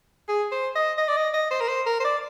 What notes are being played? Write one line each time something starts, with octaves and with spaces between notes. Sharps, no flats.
G#4
C5
D#5
D#5
D5
D#5
D#5
C5
A#4
C5
A#4
C5
D5